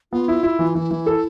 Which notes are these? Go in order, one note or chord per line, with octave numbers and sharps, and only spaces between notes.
B3 F4
E4
E4
E3
E3 E4
E3
A4